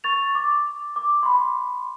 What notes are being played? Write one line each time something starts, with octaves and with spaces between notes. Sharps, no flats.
C#6 A6 F7
D6
D6
B5 C6